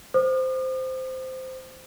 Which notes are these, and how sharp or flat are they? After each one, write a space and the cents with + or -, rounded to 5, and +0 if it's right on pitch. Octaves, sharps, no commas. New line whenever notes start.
C5 -10 D#6 -45